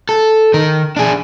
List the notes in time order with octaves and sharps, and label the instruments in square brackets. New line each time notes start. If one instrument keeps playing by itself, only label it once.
[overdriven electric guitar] A4
D#3 A#4
D4 G#4